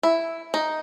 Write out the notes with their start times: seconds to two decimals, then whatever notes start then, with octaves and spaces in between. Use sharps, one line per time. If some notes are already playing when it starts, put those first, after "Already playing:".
0.03 E4
0.54 D#4